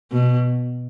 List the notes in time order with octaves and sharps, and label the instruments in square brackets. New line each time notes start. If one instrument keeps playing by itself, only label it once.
[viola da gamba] B2